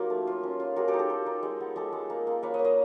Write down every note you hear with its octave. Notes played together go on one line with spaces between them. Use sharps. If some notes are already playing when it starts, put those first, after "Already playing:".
Already playing: F#3 A#3 D#4 F4 G4
A3
F4
C#4
F4
A#3 F#4 G#4
G4 A4
D#4
G4 A4
D#4
D#4
G#3
B3
G#3 G4 A4
G#3
A#3
A#3
A#3 B4 C#5
A#3 C#5 D#5
D#5 F5